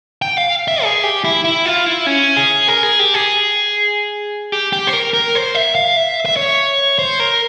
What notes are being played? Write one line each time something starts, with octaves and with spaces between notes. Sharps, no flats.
G5
F5
E5
G#4
G4
E4
E4
F4
E4
C#4
G#4
A#4
G#4
G4
G#4
G4
G4
C5
A#4
A#4
C5
E5
F5
E5
E5
C#5
C5
A#4